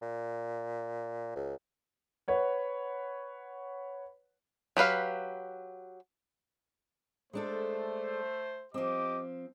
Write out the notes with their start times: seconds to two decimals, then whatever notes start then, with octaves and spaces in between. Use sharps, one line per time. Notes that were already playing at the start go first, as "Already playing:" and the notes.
0.02 A#2
1.35 C#2
2.28 B4 C#5 F#5
4.77 F#3 G4 B4 F5
7.33 G#3 A3 D4 A4 C5
8.74 F3 C4 G4 D#5 D6